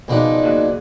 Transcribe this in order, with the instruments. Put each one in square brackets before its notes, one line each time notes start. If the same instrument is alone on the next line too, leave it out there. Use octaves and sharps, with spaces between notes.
[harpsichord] C#2 F3 D4 [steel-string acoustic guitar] B2 D#4
[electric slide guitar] A#3 F#4 G#4